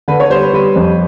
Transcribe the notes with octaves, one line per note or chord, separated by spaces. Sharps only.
D3 B4
C#5
G3 C5
B4
G3 B4
F2